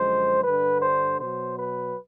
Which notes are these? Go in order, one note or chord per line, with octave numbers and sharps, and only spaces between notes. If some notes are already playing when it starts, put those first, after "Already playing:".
Already playing: F#2 D3 F3 G#3 C5
G2 D3 G3 B4
C5
B2 F#3 C5
B4